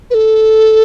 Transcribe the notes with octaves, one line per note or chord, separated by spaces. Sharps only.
B4
A4